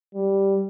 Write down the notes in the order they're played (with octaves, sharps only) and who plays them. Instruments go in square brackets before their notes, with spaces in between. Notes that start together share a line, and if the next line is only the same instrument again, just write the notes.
[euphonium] G3